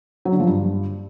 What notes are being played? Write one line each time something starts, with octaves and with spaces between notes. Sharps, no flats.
F#3
D3
F3
G2